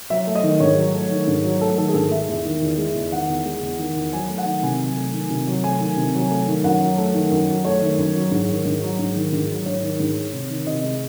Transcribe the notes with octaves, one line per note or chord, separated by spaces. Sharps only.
F#3 E5
A3
D#5
D#3
G#2 C#5
F#3
A3
D#3
G#2
F#3
A3 A4
D#3 A4
G#4
G#2 A4
G#3 E5
E2
D#3
E2
G#3
E2
D#3 F#5
E2
G#3
E2
D#3
E2
F#3 G#5
A3
F#5
D#3
C3 G#5
F#3
A3
D#3
C3
F#3
A3 G#5
D#3
C3
F#3
A3
D#3
F#2 F#5
F#3
A3
D#3
F#2
F#3
A3 C#5
D#3
F#2
F#3
G#2
D#3
G#2
F#3
G#2
D#3
G#2
F#3
G#2 C#5
D#3
G#2
G#3
C3
D#3
C3 D#5
G#3